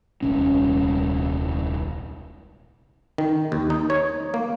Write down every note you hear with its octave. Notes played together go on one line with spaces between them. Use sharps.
D#1 C2 C#4
D#3
D#2
D#4
C#5
A#3